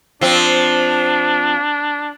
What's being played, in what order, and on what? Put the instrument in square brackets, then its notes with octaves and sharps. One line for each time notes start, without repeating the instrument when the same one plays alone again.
[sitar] F3 C4 [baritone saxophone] D4